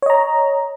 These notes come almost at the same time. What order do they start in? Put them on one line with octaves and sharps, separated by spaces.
C#5 D#5 A#5